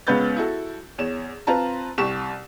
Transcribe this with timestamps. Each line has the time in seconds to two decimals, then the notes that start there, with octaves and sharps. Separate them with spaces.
0.07 C#2 B3 C#4 B4 G6 A6
0.37 E4 F#4 A4
0.98 E2 C#5 E7
1.47 C4 F4 B4 A5 A#5
1.98 C2 G4 C#6 E7